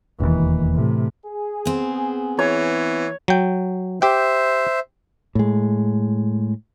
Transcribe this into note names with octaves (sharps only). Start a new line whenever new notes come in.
E1 D#2 E3
A2 C3
G#4
B3 C4
E3 C#5
F#3 G5
G4 C5 E5 G5
A2 G#3